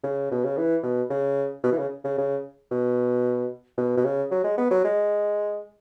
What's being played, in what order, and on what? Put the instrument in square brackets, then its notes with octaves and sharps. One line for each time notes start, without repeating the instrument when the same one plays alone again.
[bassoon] C#3
B2
C#3
E3
B2
C#3
B2
E3
C#3
C#3
C#3
B2
B2
B2
C#3
F#3
G#3
B3
F#3
G#3